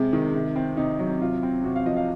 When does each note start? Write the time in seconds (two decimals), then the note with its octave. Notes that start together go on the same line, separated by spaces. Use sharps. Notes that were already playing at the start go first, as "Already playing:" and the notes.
Already playing: C3 G#3 C4
0.13 D#3
0.34 C3
0.56 C4
0.77 C3 D#4
0.99 F#3
1.21 C3 F4
1.43 C4
1.64 C3 F#4
1.76 F5
1.86 F3 D#5
1.97 F5